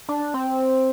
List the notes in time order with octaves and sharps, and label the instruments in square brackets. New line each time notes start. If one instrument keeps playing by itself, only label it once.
[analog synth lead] D4
C4